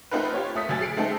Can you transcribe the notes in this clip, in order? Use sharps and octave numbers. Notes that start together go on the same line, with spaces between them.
A3 C4 D#4 F4 A#4 B4
F4 G4 C#5
A3 D#6 B6
D2 F#3 G#5 A6
G#4 C7 D7
G#3 A3 C4 D#4 A4